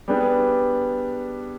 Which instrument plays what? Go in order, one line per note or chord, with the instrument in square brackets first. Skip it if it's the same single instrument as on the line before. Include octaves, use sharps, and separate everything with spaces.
[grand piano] G3 B3 D4 G#4 B4